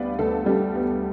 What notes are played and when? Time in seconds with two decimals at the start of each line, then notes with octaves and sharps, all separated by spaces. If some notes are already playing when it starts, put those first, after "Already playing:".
Already playing: D2 G3 B3 B4 D5 F5
0.18 D2 A4
0.46 G3
0.75 B3